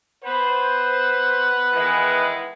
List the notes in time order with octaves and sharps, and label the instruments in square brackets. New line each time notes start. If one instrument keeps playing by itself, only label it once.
[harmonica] B4 F#5 [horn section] C5
[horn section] D#3 E3 G#3